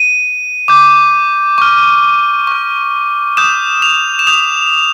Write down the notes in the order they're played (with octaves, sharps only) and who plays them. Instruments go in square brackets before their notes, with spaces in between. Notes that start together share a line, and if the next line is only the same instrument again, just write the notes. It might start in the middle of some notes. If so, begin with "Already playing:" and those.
Already playing: [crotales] D#7
D6 G6
C#6 F6
C#6 F6
D#6 G6 E7
F7
E7
D#6 G6 F7